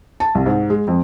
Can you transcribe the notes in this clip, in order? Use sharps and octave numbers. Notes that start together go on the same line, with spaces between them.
A5
C2
G#2
G#3
F2